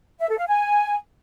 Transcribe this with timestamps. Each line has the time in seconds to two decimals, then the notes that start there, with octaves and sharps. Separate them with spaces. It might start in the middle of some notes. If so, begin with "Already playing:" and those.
0.20 E5
0.29 A4
0.38 F5
0.47 G#5